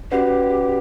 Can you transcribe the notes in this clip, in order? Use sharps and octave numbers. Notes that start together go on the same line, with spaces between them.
C#4 F#4 G4 B4 D5 F#5